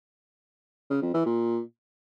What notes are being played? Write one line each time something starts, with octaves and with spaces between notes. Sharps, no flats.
C#3
F2
E3
A#2